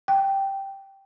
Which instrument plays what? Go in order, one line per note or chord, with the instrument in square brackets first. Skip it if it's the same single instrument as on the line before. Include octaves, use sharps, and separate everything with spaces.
[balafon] G5